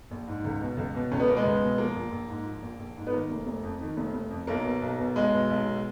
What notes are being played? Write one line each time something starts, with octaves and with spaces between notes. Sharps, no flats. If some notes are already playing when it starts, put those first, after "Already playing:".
A#1
G#2
C#2
B2
C#2
B2
C#2 C#4
B3
B2 A#3
G#3 B3
C#2
B2
F3 A#3
A#1
A#1
G#2
F3
A#1
A#1
G#2
B3
D#3 A#3
F1
F1
F2
D#3
F1
F1
F2
B1 A#3
B2
B1
B2
B1 G#3
B2
B1
B2